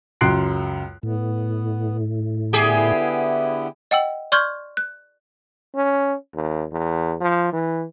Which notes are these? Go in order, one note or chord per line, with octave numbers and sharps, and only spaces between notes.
C#2 F#2 C6 F#6 C7 D7
A2 B3
D3 B3 E4 G4 G#4
D#5 F#5 G5 E6 F#7
D5 C6 C#6 F6 G6 G#6
F#6
C#4
D#2
E2
F3
E3